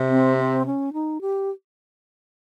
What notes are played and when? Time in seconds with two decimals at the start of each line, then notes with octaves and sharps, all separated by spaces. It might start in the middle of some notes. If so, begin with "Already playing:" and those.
Already playing: C3
0.10 C4
0.38 C4
0.66 C#4
0.93 D#4
1.21 G4